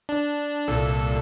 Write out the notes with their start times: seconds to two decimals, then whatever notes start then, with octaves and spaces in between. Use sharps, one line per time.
0.09 D4
0.68 C2 A#2 A4